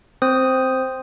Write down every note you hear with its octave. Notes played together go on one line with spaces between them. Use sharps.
C4 C5 D#6